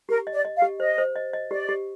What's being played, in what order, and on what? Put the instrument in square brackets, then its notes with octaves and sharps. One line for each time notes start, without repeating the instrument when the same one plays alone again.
[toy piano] G4 [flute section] A#4
[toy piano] D#5
[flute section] D5
[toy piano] D#5
[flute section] F5
[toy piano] G4
[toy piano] C5 [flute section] D#5
[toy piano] C5
D#5
D#5
[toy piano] G4 [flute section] D5
[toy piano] G4